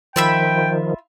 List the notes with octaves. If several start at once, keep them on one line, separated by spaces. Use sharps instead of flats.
D#3 F3 F4 E5 G5 B5